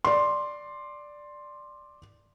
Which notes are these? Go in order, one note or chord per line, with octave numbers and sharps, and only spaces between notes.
D5 C6